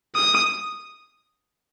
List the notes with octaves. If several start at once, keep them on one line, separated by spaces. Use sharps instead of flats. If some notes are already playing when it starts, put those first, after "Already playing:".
D#6